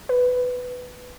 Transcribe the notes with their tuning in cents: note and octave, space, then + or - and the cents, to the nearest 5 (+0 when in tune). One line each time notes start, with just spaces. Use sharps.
B4 +10